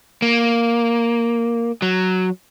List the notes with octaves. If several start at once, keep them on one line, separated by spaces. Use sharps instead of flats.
A#3
F#3